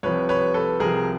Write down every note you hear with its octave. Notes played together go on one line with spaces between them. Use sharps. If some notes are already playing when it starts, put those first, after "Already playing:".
C2 C3 F3 B4 C#5
B4 C#5
A4 B4
C2 C3 F3 G#4 A#4